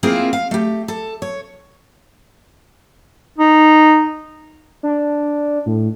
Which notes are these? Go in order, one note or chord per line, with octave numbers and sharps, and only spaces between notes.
A#3 C4 E4 F4 G#4 A#4
F5
A3 G4
A4
C#5
D#4
D4
A2